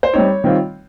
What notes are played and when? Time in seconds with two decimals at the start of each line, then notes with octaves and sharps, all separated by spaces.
0.03 C5
0.13 G3 C4 D#4 C#5
0.44 D#3 G3 C4 F4